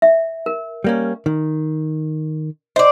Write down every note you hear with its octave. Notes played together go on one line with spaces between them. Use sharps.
E5
A#4
G3 A#3 C#4
D#3
C5 D5 D#5